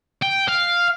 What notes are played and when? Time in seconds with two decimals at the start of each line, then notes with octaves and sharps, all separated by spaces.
0.22 G5
0.48 F5